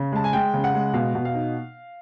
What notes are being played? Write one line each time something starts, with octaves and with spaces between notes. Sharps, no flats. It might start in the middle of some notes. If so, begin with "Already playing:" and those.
Already playing: C#3
G#3 A5
G#5
G#3 G5
C#3
F#5
G#3
B2 F5
B2
F5
D#4